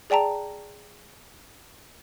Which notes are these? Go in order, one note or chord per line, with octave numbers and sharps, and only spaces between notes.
G#4 D5 G5 A5 A#5